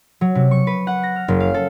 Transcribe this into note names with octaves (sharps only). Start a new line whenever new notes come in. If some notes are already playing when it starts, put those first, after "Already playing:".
F#3
C3
C#6
B4
F#5
A#6
F6
F#1
F5
A4